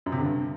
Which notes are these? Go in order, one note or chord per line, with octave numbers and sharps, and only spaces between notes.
F#2
C3
D3
G2